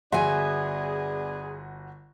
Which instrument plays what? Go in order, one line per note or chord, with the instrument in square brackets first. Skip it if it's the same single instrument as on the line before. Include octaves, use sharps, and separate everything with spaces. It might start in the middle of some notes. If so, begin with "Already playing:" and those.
[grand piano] G1 F#4 C6 [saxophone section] B3 D4 G#4 [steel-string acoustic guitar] E5 G#5